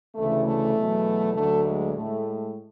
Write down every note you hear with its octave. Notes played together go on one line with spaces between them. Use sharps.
D2 C#3 E3 A3
A3
E2 B2 F#3
D2 D3 F#3 A3
G#3
A2 G#3 A3